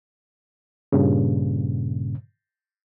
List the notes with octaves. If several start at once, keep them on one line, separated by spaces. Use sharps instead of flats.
G2 A#2 C#3